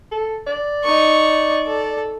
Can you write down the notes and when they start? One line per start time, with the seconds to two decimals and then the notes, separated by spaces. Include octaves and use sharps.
0.11 A4
0.47 D5
0.84 D#4 C#6
1.67 A4